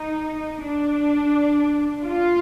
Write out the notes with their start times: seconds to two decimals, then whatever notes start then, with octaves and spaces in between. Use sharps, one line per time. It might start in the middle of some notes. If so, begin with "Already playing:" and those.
Already playing: D#4
0.66 D4
2.07 F4